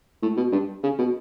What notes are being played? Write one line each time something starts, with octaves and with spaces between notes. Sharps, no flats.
A2
B2
G2
C#3
B2